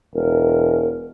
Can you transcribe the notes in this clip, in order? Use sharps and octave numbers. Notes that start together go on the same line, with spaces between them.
E1 A#4